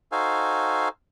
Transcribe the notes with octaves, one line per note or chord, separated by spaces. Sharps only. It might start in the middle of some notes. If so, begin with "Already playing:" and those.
D#4 F#4 A4 C5 F5 G#5